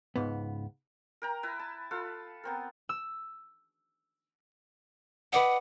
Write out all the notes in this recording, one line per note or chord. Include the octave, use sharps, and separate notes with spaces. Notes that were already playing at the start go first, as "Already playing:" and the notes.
C#2 G#2 B3
A#4 G5 A#5
E4 B4
A5
F4 A4 B4
B3 C4 A#4
E6
B4 D5 D#5 F#5